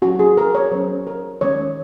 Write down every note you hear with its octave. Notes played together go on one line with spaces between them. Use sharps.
F#3 C#4 F#4
G#4
A#4
C#5
F#3 C#4 C5
A#4
D#3 G#3 C#4 C#5